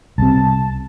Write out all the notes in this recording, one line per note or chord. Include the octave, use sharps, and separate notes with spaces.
C2 C3 A5